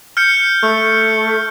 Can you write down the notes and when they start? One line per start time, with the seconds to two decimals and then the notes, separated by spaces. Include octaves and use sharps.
0.17 F6 G6 C#7
0.63 A3